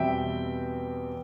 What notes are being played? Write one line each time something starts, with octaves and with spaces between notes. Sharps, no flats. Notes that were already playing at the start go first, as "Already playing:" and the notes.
Already playing: E2 B2 G3 C4 E5 G5